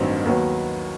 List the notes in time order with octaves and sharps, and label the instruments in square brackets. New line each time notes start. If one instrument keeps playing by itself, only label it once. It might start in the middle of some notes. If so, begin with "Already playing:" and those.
Already playing: [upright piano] A1 G2 D#3 F#3 C4
D#2 D#3 F#3 B3